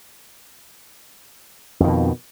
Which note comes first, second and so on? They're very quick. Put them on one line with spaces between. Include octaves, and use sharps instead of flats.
F2 D#3 B2